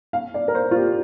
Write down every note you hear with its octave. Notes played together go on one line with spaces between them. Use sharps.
F5
D5
A#4
C5
F4
G4